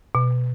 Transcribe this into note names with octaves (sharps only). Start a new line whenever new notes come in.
B2